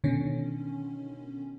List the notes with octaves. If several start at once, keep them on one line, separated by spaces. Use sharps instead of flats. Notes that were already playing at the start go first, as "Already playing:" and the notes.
B2 D3 D#3 C#4